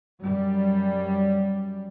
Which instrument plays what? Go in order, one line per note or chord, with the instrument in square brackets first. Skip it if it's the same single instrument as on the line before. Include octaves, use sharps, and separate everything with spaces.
[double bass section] F#2 G3